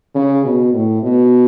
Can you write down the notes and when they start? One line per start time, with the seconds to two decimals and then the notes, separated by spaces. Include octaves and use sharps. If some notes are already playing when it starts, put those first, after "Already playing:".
0.15 C#3
0.45 B2
0.74 A2
1.03 B2